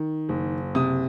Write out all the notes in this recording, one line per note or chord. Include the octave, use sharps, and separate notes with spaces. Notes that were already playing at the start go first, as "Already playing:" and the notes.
Already playing: D#3
F#1
C3 D#6